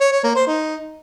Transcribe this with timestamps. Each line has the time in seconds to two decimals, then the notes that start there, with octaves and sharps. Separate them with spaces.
0.01 C#5
0.12 C#5
0.24 A#3
0.35 C5
0.47 D#4